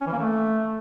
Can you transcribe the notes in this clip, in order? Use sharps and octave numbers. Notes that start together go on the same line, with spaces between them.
C#4
E3
A#3
A3